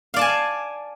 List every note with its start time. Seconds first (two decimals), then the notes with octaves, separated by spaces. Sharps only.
0.14 F5
0.16 D5
0.19 A5
0.21 G#5